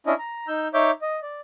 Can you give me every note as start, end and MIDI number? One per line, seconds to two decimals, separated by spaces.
0.07 0.14 61
0.07 0.14 62
0.07 0.14 64
0.07 0.14 75
0.18 0.47 82
0.48 0.68 63
0.48 0.68 88
0.48 0.68 91
0.74 0.91 63
0.74 0.91 73
0.74 0.91 76
0.74 0.91 86
0.74 0.91 91
1.02 1.20 75
1.22 1.41 74